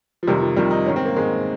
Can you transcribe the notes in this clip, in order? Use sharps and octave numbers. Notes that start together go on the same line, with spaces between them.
F3
F2 C3 D#3 G3
F3
F2 C3 D#3 G3
D#4
G#2 D#3 C#4
C4
A#3
G#2 D#3 G#3